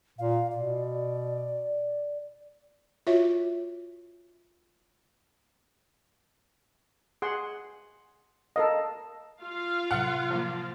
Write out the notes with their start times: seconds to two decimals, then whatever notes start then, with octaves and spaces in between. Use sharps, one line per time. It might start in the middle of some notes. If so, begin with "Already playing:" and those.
0.19 A#2 F5
0.51 B2 D5
3.07 F4 F#4 C#5 E5
7.22 G#4 F#5 C6
8.56 A4 A#4 D#5 F5
9.41 F4 F5
9.91 A2 C3 F#3 F#5
10.31 F3 A#3